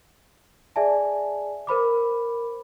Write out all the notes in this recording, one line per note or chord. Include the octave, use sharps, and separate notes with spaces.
G#4 D5 E5 G#5 A5
A#4 C5 B5 D6